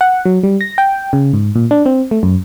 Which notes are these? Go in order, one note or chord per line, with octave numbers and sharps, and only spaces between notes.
F#5
F#3
G3
A#6
G5
C#3
G#2
A#2
D4
C4
A3
F#2